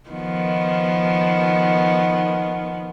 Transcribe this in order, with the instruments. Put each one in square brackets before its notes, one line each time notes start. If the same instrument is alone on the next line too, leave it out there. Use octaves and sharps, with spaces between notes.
[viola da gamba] D#3 F3 B3